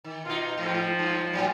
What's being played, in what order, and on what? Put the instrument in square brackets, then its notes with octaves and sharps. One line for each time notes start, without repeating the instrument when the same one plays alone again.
[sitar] D#3
[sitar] B2 D#4 [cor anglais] F4
[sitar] G#2 [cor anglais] F3
[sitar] G2
A2 F#3